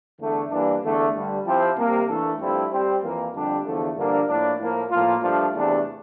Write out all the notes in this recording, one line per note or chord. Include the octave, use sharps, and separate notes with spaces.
E2 D3 A3
G2 E3 A#3 D4
E2 D3 A3
G2 D3 G3
F3 C4 E4 G4 C5
C3 G3 A#3
E3 A3 D4 A4
G2 F3 A3 C4 E4
G3 C4 G4 C5
F2 E3 A#3
F2 D3 G3 D4 G4
E2 D3 F3 A3
G2 D3 F3 A#3 D4
A2 F3 A#3 D4
A2 F3 A#3
A2 F3 A#3 F4
G2 F3 A3 D4 F4
E2 C3 E3 A3 D4